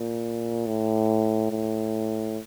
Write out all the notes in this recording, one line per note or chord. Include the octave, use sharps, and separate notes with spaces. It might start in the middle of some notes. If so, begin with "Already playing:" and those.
Already playing: A#2
A2
A2